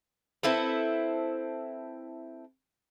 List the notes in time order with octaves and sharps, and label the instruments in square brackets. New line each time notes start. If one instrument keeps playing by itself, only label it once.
[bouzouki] C4 E4 A4 B4